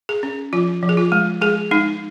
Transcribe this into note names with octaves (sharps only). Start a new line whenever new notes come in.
G#4
C#4
F3 F4
F3
G#4
F4
G#3
G#3 G#4
G#3 D#4